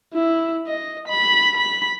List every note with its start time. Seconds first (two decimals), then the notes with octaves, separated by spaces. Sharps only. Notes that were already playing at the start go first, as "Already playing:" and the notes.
0.14 E4
0.67 D#5
1.08 B5
1.57 B5